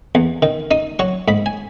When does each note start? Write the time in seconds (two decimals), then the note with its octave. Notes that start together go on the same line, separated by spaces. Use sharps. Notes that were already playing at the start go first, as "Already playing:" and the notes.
0.15 E2
0.42 D#3
0.71 D#4 D#6
0.99 F#3 C#6
1.28 G#2 B5
1.46 G#5